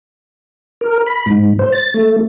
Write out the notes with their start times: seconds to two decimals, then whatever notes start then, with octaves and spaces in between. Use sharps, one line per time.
0.81 A#4
1.07 B5
1.26 G#2
1.59 C5
1.72 A6
1.94 A3